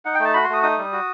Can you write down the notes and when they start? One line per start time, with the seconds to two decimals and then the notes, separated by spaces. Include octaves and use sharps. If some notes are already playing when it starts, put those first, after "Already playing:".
0.05 D#4 F#5
0.14 G5
0.20 A3 A5
0.34 F#4 B5
0.44 C6
0.49 A3 D#6
0.63 D#4 D#6
0.78 G3
0.93 F#4